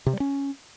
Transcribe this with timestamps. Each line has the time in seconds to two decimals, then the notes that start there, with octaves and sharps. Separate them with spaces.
0.06 C3
0.13 G3
0.20 C#4